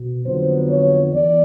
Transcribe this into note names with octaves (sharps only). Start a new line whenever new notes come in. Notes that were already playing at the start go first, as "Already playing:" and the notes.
Already playing: B2
F2 D3 F#3 B3 C5
C#5
E2 D5